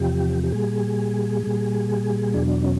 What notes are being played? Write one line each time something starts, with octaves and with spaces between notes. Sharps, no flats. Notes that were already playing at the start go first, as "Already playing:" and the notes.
Already playing: E2 C3 F3 G4
G4
A#2 G3 G#4
A#2 G3
E2 B2 F#3 D4
C#4